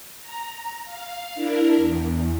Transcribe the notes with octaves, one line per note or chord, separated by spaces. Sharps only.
A#5
F5
D4 E4 A#4
E2